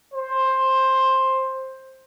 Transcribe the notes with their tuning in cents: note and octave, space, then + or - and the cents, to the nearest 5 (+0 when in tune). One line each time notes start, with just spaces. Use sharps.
C5 +10